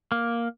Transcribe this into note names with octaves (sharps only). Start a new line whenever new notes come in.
A#3